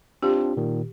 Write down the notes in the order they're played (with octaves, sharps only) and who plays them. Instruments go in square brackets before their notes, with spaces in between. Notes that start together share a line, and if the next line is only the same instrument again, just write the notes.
[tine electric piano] C4 D4 F4 [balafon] G4
[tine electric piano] A#2 D#3